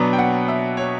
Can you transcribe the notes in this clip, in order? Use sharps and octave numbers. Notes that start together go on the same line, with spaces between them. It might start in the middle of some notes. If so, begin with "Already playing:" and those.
Already playing: B2 F#3 B3 D4 A#5
G5
F#5
E5
C#5